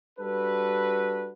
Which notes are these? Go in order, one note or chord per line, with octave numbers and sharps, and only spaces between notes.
G3 D4 F#4 A4 B4